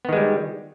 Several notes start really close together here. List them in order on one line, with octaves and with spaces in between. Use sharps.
B3 D#3 G#3 G3